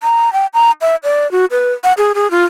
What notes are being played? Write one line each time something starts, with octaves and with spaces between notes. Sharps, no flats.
A#5
G5
A#5
E5
D5
F#4
B4
F#5
G#4
G#4
F4